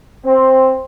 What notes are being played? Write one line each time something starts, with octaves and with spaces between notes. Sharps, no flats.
C4